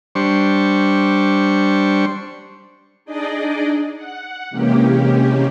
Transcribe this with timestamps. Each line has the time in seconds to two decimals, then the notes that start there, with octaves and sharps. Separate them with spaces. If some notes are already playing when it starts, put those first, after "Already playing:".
0.15 G3 D4 C5 C#6
3.05 D4 D#4 G#4 D5 D#5
3.96 F#5
4.50 C3 E3 G#3 A#3 C#4 G4